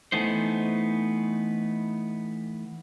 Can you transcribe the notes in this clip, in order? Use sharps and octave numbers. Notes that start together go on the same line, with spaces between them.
E3 A3 B3 D#4 C5